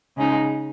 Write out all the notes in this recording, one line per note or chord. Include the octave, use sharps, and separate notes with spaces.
C#3 G#3 D#4